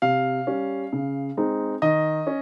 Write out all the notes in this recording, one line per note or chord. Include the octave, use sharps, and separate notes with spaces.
C3 F5
G3 C#4
C#3
G#3 C4 D#4
D#3 D#5
C#4